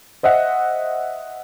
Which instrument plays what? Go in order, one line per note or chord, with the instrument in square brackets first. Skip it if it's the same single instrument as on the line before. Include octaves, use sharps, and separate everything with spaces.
[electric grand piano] C5 D#5 E5 F#5